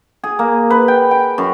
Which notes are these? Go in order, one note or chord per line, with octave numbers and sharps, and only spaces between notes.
G#4
A#3
B4
G5
G5
F#2